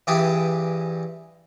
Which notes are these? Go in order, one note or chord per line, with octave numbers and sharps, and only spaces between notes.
G2 E3 G4 G#4 D6 D#6